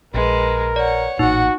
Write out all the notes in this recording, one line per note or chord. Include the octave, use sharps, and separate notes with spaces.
A#1 G#3 A#4 B4
C#5 D5 F#5
A1 A#2 D#4 F#4 F#5